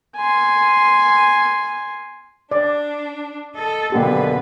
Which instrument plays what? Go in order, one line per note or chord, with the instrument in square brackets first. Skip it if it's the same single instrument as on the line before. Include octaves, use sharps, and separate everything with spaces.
[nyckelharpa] G#5 C6
[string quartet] D4 [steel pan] D5
[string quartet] A4 D#5
[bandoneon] F#2 D3 [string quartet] B2 B4 [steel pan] A#3 G4